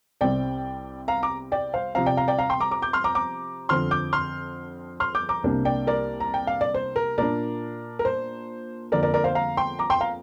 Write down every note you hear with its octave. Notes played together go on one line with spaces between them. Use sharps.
C2 C3 G3 C4 D5 G5
F5 A#5
A#5 D6
D5 G5
C5 F5
C3 F3 C4 F5 A#5
D5 G5
F5 A#5
D5 G5
F5 A#5
G5 C6
A#5 D6
A#5 D6
D6 G6
C6 F6
A#5 D6
A#5 D6
F2 D3 F3 C4 C6 F6
D6 G6
C6 F6
C6 F6
D6 G6
A#5 D6
C2 C3 A#3 D4
D5 G5
A#4 D5
A#5
G5
F5
D5
C5
A#4
A#2 A#3 D4 A#4 D5
A#4
C5
F2 D3 A#3 A#4 D5
A#4 D5
A#4 D5
C5 F5
F5 A#5
G5 C6
A#5 D6
G5 C6
F5 A#5